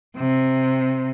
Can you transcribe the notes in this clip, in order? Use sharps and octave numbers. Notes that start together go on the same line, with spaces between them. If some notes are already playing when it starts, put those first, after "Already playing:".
C3